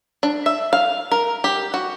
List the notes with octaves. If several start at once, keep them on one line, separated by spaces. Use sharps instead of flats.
D4
E5
F5
A#4
G4
F#4